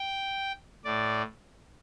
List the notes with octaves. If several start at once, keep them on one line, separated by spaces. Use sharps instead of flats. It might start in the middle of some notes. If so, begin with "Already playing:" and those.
Already playing: G5
A2 D5